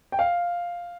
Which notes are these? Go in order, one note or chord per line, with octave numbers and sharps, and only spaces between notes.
G5
F5